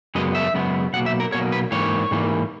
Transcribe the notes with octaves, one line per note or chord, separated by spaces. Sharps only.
F#2 C#3 G#3 B3 D#5
E5
F#2 C#3 G#3 B3
B1 B2 A#3 F#5
E5
A#4
B1 B2 A#3 C#5
B4
G#2 E3 A#3 C#5
G#2 E3 A#3